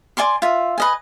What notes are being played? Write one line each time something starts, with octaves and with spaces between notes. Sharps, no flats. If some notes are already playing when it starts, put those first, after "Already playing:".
D5 G#5 C6 D6
F4 E5
B4 D#5 G#5